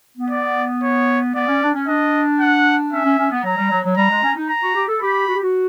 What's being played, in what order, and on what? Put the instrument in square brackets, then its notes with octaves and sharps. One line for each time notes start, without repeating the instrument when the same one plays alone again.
[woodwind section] B3
[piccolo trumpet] D5
C#5
[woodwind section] B3 [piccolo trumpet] D5
[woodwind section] C#4
D4
C#4
[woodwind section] D4 [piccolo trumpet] D#5
[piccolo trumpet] F#5
[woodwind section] C#4 [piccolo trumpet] E5
[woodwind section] C#4
C#4
B3
[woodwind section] F#3 [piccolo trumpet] A#5
[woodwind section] G3
F#3
F#3
[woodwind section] G3 [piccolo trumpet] A#5
[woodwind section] G#3
C#4
D#4
[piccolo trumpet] A#5
[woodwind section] F#4
G4
A4
[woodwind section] G4 [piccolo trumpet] B5
[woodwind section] F#4
G4
F#4